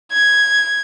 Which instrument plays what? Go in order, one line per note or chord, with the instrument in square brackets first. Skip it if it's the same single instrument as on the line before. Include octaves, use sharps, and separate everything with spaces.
[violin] G#6